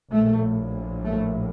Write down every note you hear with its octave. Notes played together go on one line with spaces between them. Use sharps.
A#1 A2 A3
A3